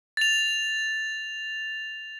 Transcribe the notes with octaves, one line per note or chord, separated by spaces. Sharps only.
A6 F7